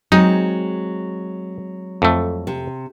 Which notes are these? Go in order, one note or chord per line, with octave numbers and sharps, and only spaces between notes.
F#3 G#3 C4 D#4
F2 A3
C3